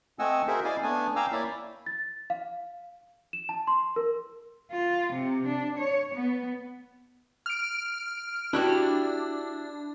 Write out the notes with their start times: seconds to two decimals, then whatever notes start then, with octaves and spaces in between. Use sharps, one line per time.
0.19 A3 C4 D#5 F#5 G#5 E6
0.47 F#4 G#4 A#4 C5 E5
0.64 E4 D5 D#5 F5 G#5
0.82 A3 B3 D4 G#5
1.16 F5 G5 G#5 A#5 D6 E6
1.32 A#3 E4 C#5 D5 E5
1.86 A6
2.30 F5
3.33 E7
3.49 A5
3.67 C6
3.96 A#4
4.71 F4
5.13 C3
5.46 D4
5.78 C#5
6.14 B3
7.46 F6 D7
8.53 D4 E4 F#4 G4